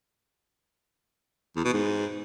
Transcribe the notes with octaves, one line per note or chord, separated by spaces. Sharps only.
E2
B2
G#2